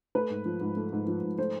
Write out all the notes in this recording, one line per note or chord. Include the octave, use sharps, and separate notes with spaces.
A3 B4
G#2
F3
G#2
A3
G#2
F3
G#2
A3 C5